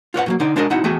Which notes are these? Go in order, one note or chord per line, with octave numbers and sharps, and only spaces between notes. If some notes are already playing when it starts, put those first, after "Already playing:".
F4 B4 C#5 F#5
A2 F#3 A#3
D3 D#4 D5
G#3 D4 F#4 A#4 B4 D#5
B2 C4 D#4 E4 F#5
E2 A3 F#4 G#4 G5 G#5